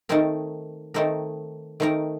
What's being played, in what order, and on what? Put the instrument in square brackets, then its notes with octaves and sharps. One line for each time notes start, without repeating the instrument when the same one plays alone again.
[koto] D#3 A3 C4 D#4 A#4
D#3 A3 C4 D#4 A#4
D#3 A3 C4 D#4 A#4